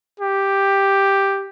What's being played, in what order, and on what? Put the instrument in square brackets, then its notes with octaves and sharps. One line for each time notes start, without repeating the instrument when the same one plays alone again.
[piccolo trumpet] G4